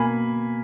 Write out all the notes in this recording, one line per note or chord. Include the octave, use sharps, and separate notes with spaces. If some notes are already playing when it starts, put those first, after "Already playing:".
Already playing: B2 A#3 G#5 B5